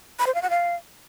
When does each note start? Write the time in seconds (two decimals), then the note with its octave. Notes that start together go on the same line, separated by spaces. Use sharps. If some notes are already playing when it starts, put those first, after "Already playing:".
0.19 B5
0.27 C5
0.34 F5
0.42 F#5
0.50 F5